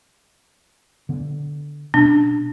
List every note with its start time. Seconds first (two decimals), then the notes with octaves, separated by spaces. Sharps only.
1.09 D3 B3
1.94 B2 B3 C#4 D4